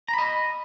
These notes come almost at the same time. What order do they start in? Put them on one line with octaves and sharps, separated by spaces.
A#5 B5 D#5